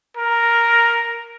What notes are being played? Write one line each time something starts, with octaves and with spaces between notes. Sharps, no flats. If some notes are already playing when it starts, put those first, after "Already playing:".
A#4